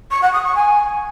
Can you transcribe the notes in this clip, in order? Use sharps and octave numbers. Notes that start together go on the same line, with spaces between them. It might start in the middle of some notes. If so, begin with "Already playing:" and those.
C#6
F#5
D#6
C#6
G#5